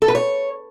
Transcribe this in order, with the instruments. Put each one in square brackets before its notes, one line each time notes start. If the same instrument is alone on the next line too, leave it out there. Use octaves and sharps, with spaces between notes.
[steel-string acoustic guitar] A4
B4
C#5